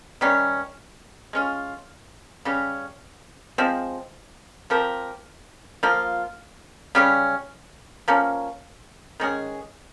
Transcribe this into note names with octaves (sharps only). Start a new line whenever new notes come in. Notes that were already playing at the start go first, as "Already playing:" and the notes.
D#3 G3 C#4
G#3 C#4 F4
C#3 G3 C#4
F3 G#3 C4
F3 C4 G4 A#4
F3 A#3 F4
C#3 G3 C#4
F3 A#3 C#4
D#3 G#3 C#4 G#4